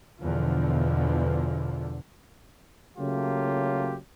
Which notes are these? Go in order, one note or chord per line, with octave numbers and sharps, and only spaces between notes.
E2 B2 D3 F3
C#3 F#3 A3 A#3 F4 G4